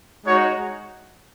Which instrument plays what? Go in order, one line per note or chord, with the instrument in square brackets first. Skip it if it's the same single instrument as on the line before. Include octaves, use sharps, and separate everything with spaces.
[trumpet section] G#3 D#4 F#4 C#5